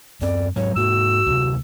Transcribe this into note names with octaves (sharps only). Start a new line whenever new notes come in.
F#2 C4 D5
G#2 F#3 C#5
G#2 A#3 F#4 E6
D2 C3